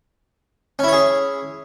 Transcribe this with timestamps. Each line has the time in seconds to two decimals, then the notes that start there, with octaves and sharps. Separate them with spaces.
0.79 C#4
0.84 E4
0.88 C#5
0.93 G#4